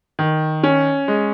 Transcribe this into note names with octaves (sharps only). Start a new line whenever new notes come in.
D#3
C#4
G#3